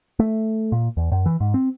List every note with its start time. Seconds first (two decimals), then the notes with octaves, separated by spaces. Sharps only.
0.19 A3
0.72 A#2
0.97 E2
1.12 F#2
1.26 E3
1.41 G#2
1.54 C4